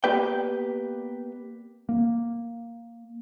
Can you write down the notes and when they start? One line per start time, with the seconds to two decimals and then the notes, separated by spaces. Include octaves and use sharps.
0.04 A#3 B3 G4 B4 D5 G5
1.89 A#3